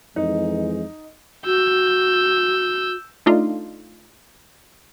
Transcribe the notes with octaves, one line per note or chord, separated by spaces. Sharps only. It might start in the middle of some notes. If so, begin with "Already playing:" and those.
F2 E3 G#3 D#4
F#4 E6 G6
A3 D4 D#4 F4